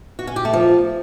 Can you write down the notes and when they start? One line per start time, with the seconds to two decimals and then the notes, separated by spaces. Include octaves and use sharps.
0.19 F#4
0.27 C#4
0.36 G4
0.45 A3
0.53 F3